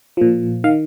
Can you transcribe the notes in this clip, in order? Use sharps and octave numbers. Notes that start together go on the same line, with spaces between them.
A#2 F3
D#3 F5